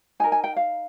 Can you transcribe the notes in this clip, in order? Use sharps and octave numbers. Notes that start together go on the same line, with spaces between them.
D#4 A#4 G#5
G#5
G5
F5